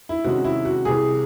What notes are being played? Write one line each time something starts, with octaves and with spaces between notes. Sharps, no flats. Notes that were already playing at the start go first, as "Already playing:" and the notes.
E4
C3 D#3 G#3 C#4 F#4
E4
F#4
C2 C3 E3 G#4